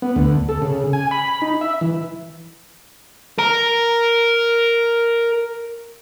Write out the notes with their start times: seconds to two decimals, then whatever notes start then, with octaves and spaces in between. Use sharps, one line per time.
0.02 B3
0.16 D2
0.49 A4
0.62 C#3
0.93 G#5
1.11 B5
1.42 D#4
1.61 E5
1.81 E3
3.38 A#4 A#5